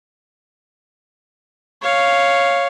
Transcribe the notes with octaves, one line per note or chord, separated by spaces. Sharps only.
C#5 F5